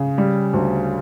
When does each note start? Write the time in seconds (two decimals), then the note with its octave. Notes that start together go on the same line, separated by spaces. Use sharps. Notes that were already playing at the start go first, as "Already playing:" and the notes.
Already playing: C#3
0.18 G3
0.53 D2